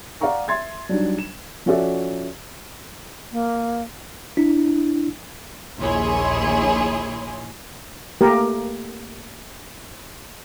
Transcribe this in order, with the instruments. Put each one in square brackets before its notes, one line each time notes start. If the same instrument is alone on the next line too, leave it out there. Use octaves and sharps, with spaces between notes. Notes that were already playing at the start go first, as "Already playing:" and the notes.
[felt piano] D5 F5 F#5 A#5 C#6
E5 C6 G#6 A6
F#3 G3 D4 D#4
E7
F3 C#4 F#4 A4 D5 E5
[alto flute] A#3
[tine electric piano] D4 E4
[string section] A#1 D#2 E4 G#4 C#5 C6
[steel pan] A3 A#3 G4 A#4